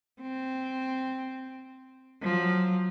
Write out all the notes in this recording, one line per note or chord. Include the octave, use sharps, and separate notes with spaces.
C4
F3 F#3